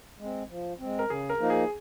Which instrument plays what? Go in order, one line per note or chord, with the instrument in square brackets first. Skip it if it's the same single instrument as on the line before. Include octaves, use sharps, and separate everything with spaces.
[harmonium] G#3 C4
F3
G#3 C4
[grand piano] A#4
[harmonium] C#3 [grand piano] G#4
[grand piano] A#4
[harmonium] F3 A#3 D#4
[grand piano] G#4